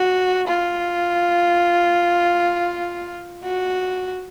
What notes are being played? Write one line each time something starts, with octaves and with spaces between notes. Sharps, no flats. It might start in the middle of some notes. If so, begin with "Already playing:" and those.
Already playing: F#4
F4
F#4